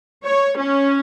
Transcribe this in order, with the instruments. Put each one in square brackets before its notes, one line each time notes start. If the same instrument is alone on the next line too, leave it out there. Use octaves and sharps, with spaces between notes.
[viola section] C#5
C#4